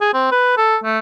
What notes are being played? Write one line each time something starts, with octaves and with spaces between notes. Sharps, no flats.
G#4
C4
B4
A4
A3